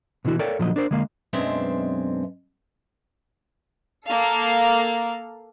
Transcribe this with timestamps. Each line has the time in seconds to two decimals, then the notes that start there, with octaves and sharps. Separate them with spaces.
0.25 B2 D3 E3 E4 F#4
0.39 A4 A#4 C#5 D5 F5 G5
0.59 A#2 D3 F3 F#3 D#5
0.76 D4 A#4 C5
0.91 D3 G#3 A#3 F5
1.33 F#2 B2 G#3 C4 D4 E5
4.06 A#3 A4 F5